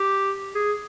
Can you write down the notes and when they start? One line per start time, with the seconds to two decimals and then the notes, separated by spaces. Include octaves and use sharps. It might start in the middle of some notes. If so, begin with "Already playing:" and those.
Already playing: G4
0.55 G#4